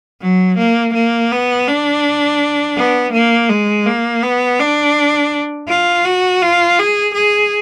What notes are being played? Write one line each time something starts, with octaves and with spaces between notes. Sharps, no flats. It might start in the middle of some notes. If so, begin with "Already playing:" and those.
F#3
A#3
A#3
B3
D4
B3
A#3
G#3
A#3
B3
D4
F4
F#4
F4
G#4
G#4